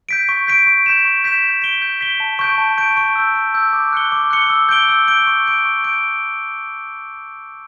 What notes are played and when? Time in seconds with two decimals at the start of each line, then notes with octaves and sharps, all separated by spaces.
0.09 G6 B6 D7
0.29 C#6
0.47 G6 B6 D7
0.67 C#6
0.86 G6 B6 E7
1.05 C#6
1.24 G6 B6 E7
1.43 G6
1.62 B6 D7 G7
1.82 G6
2.01 B6 D7 G7
2.20 A5
2.39 C#6 G6 D7
2.58 A5
2.77 C#6 G6 D7
2.97 C#6
3.15 E6 G6
3.35 C#6
3.54 E6 G6
3.73 D6
3.93 F#6 C#7 G7
4.12 D6
4.31 F#6 C#7 G7
4.50 E6
4.69 G6 D7 G7
4.89 E6
5.08 G6 D7 G7
5.27 C#6
5.46 G6 D7
5.65 C#6
5.84 G6 D7